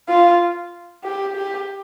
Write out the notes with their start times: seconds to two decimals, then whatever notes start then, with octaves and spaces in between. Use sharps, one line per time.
0.09 F4
1.05 G4
1.36 G4